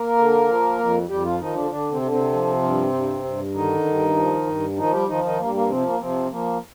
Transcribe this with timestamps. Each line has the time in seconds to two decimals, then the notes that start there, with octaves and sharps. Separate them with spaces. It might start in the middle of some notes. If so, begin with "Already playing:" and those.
Already playing: A#3 A#4
0.18 D3
0.48 F3
0.79 F2
1.09 F2 G3 G4
1.25 F3 F4
1.40 D#3 F3 D#4
1.55 D3 D4
1.70 D3 D4
1.91 C3 C4
2.02 D3
2.11 C3 C4
2.32 F3
2.63 G2
2.93 G2
3.24 G2
3.55 D3 D#3 D#4
3.85 G2
4.16 F3
4.47 G2
4.77 D#3 F3 D#4
4.93 G3 G4
5.08 D#3 F3 D#4
5.23 D#3 D#4
5.39 G2 A#3
5.54 A#3
5.69 C3 F3 C4
5.85 A#3
6.00 C3 F3 C4
6.30 F3 A#3